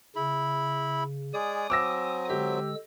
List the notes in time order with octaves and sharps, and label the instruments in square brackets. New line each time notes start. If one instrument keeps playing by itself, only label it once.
[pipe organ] C#3 [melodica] E4 B5
[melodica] G#3 G#4 D5 [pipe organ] G#5 D#6
[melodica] F#3 C4 [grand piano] D6 E6 A#6
[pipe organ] D3 G#3 E6 [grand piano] G4